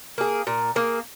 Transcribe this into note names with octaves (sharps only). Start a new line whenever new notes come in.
A#3 G#4
A#2
A#3 G#4